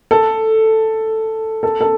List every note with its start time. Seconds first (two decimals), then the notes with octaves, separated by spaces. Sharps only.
0.11 A4
1.63 A4
1.81 A4